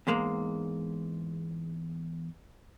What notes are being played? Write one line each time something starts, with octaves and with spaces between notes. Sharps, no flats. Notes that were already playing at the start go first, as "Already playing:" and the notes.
E2 G#2 G#3 A#3